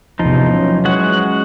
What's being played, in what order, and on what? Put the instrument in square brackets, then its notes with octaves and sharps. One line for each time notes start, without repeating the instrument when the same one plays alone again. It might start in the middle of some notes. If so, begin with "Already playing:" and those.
[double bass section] A1 E2 C3 [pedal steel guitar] F3 D#4
[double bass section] E3 F#3 C#4
[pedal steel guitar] G#3 F#4 F#5